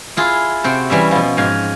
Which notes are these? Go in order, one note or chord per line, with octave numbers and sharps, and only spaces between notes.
E4 F4 G#4
C3 C4 F#4 C5
E3 G3 C#4 E5
B2 F3
G#2 F3 F5 G#5